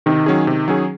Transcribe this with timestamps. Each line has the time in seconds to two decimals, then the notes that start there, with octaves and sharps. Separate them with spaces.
0.06 C3 D#3
0.26 F#3 C#4 G#4
0.47 C3
0.68 F#3 C#4 G#4